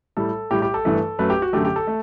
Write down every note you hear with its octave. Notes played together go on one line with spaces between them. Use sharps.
A2 G3 A4
A2 G3 G4
G4
A4
G2 E3 A3
F#2 F#3 A3 B4
G4
F#4
F#2 D3 A3 G4
G4
A4
A3